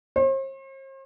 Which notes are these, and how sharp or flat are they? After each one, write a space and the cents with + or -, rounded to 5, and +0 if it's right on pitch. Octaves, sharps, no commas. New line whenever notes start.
C5 +45